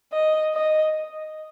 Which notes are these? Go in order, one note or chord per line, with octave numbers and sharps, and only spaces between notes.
D#5
D#5